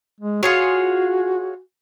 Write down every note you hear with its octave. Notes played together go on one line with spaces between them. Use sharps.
G#3
F4 F#4 G#4 C#5